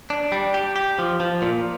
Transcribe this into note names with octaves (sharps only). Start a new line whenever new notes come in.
D4
G3
G4
G4
F3
F3
A#2